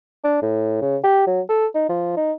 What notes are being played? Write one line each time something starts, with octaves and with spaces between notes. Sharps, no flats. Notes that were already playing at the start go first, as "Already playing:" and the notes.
D4
A2
C#3
G4
F#3
A4
D#4
F3
D#4